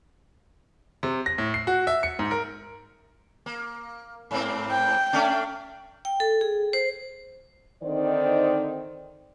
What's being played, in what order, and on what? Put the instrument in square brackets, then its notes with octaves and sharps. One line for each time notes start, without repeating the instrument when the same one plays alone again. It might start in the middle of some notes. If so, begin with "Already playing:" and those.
[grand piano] C3
A#6
A2
C7
F#4
E5
C#7
G#2
A#4
[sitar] A#3
G#2 A#3 C4
[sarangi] G5
[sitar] A3 C#4 D4
[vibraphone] G5
A4
G#4
C5
[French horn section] D3 D#3 C4 D#4 C5 D5